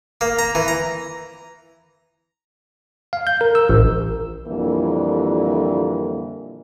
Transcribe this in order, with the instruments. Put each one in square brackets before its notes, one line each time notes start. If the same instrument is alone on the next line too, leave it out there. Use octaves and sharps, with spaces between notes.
[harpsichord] A#3
A#5
E3
A#5
[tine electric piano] F5
G6
A#4
E6
A1
[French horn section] F2 A#2 D3 E3 G3 A#3